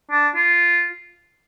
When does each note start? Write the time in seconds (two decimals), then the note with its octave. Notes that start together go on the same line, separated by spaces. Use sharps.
0.11 D4
0.35 F4